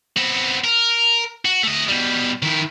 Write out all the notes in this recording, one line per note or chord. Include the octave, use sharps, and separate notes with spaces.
B3 C4
A#4
F#4
A3 D#5
B2 G3
D#3 E4